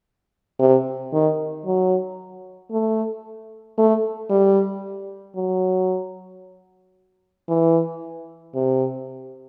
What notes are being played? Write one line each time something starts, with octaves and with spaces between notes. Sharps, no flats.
C3
D#3
F#3
A3
A3
G3
F#3
E3
C3